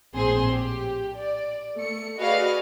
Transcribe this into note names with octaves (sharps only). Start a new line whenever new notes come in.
A#1 A2 C4 G#4 C5 C6
G4
D5
A3 C#7
F#4 G#4 B4 D5 D#5 F5